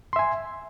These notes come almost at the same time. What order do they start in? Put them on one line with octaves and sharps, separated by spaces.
C6 E5 G#5